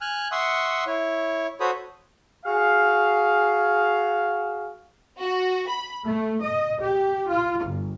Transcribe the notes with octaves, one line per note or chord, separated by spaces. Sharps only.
G#5 F6 F#6
E5 F#5 C6 C#6 D#6 E6
E4 C#5
F#4 A4 C5 C#5 B5 D#6
F#4 G#4 F5
F#4
B5
A3
D#5
G4
F4
G1